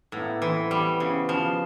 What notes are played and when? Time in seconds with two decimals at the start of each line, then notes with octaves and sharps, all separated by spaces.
0.12 A2 B3
0.21 A#3
0.28 B3
0.42 E3 C4
0.71 G3 B3
0.89 C4
1.00 C#3 B3
1.29 F3